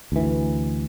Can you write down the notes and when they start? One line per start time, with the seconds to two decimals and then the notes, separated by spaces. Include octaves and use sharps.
0.12 D2 E3